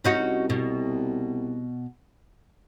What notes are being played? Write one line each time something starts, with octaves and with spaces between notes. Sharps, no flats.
C2 C#4 D#4 F#4
B2